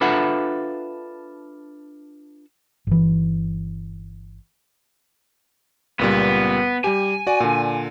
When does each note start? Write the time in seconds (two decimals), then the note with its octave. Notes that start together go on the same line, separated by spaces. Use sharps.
0.01 D4 F4 A4 B4 E5 F#5
2.87 G1 E3
5.99 C#2 A#2 G3 B3
6.84 G3 G4 G#5
7.27 F#4 D5
7.40 A#2 D3